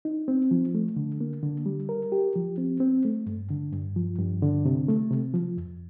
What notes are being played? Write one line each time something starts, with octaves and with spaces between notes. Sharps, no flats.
D#4
C4
F3
A3
D3
A#3
D3
G3
A#4
G4
F3
C4
C4
A3
G2
D3
G2
F3
G2
D3
C3
A3
C3
F3
F2